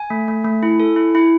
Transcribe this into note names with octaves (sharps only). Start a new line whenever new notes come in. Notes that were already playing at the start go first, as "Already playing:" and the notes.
Already playing: G#5
A3
A3
A3
E4
A4
E4
E4